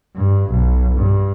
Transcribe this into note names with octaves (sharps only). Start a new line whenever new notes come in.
G2
B1
G2